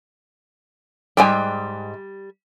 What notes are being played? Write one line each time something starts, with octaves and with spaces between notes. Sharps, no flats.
G#2 G3 G#3 G5 G#5